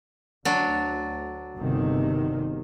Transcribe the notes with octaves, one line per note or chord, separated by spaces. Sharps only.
D2 F#3 D4
G1 C3 D#3